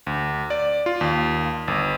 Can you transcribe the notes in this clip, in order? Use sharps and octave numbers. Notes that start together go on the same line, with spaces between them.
D2
D5
F4
D#2
G1